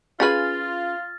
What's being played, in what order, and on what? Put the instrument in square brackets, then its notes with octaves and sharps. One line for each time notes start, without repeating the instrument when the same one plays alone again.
[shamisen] C#4 G#4 B4 [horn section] F4 [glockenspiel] F6 A6